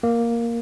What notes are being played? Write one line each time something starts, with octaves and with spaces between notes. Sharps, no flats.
A#3